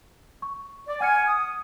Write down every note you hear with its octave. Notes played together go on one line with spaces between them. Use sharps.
C#6
D5
F#5 G#5 F6 C#7
D#6